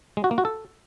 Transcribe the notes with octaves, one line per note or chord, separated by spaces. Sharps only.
G#3
F#4
A#3
F#4
A4